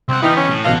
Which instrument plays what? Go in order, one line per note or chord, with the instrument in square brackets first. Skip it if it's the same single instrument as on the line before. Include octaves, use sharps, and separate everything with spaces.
[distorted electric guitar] C2 F#5 [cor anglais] C4
[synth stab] E3 G5 F6 [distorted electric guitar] B3 G4 [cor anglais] D#4
[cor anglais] C#4
[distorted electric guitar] A2
[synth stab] A1 B2 A#6 [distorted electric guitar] A4 F#5 [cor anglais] F5